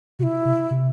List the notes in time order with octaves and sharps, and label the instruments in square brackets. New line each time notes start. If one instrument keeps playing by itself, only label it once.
[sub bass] C3 [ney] F#4
[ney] E4
[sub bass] C3
C3